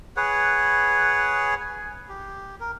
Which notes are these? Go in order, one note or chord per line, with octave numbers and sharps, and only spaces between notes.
G#4 B4 C#5 F#5
G#5
G4
A#4